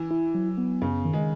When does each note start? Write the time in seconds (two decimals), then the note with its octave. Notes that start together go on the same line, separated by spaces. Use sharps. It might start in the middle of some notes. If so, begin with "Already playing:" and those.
Already playing: E3
0.11 E4
0.35 F#3
0.58 B3
0.82 F#2 C#3
1.05 D#3
1.13 G#3